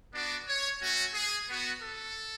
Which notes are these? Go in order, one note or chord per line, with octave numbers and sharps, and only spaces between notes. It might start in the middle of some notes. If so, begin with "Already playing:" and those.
B3 D4 F#4 D5
C#5
A3 C#4 F#4
G#4
B3 F#4
A4